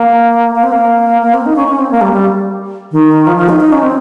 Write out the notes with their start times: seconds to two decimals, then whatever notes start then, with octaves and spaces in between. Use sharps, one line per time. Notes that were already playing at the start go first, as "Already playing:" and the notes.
Already playing: A#3
0.55 A#3
0.63 C4
0.72 A#3
1.22 A#3
1.34 C4
1.46 D#4
1.56 C#4
1.68 C#4
1.79 C4
1.91 A#3
2.01 G3
2.14 G3
2.92 D#3
3.27 F3
3.37 F3
3.49 D#4
3.60 D#4
3.72 C#4
3.83 C4